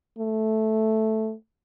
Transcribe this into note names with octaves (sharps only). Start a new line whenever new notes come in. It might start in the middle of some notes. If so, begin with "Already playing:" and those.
A3